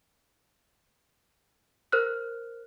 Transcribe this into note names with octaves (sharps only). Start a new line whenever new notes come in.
A#4 C5 F6 F#6